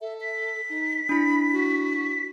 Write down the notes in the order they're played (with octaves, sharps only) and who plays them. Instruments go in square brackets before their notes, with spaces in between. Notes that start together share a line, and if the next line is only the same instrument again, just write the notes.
[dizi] A4 [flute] E5
[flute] B6
[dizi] D#4
[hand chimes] D4 E4 [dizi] B5
[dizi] F#4